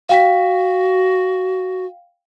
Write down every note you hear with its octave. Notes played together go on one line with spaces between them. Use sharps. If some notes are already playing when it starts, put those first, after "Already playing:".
F#4 F5 G5 B6